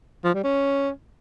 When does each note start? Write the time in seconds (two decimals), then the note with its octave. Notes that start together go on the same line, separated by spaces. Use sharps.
0.24 F3
0.34 G3
0.44 C#4